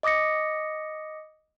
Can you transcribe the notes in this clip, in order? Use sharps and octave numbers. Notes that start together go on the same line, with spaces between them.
D#5 D6 D#6 A#6 C#7